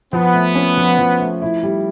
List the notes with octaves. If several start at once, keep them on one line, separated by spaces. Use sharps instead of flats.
F3 B3
A3
C#4
F3
F3
A3
E4
G3